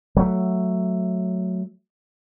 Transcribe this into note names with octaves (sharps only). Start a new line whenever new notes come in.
F#3 A3